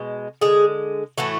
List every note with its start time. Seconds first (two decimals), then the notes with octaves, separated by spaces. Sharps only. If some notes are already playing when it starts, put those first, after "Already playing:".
Already playing: B2 G#3
0.42 D3 G#3 G#4
1.18 A2 E3 A3 F#4